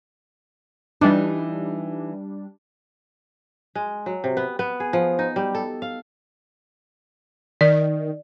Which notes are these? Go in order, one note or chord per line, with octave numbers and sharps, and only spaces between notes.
E3 G3 D4 D#4
G#3
F#3
C3
B3
B3
G#4
F3
D#4
G3
A4
F5
D#3 D5